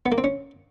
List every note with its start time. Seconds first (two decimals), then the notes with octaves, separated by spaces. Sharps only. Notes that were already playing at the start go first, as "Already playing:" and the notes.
0.06 B3
0.12 A#3
0.18 C4
0.24 C#4